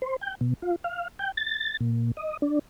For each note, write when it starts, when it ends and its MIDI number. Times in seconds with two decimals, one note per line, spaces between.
0.02 0.16 72
0.21 0.35 79
0.41 0.54 47
0.62 0.76 65
0.84 1.08 77
1.19 1.32 79
1.37 1.77 93
1.80 2.11 46
2.17 2.37 75
2.42 2.59 62